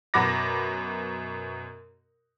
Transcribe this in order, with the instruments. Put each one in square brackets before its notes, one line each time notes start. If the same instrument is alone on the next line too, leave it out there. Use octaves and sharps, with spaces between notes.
[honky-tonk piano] F#2 B2 F#5 B5 D6 A#6